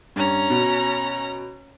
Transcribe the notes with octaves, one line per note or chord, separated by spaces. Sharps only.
G2 C#4 A#5
B2